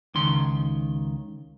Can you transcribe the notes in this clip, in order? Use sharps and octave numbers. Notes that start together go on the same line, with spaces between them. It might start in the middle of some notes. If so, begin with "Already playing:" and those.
C#2 D#3 C6